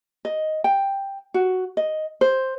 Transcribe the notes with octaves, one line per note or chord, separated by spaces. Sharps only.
D#5
G5
F#4
D#5
C5